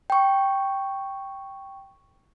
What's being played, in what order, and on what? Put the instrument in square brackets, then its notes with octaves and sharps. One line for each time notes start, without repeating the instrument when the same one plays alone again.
[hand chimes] G5 C#6